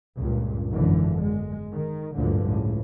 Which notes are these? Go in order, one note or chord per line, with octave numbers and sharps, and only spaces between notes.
C#2 G2 A#2
G#1 F#2 B2 D3 E3
G#3
D#3
A1 D2 G2 A#2 D3 F3
C#2 A2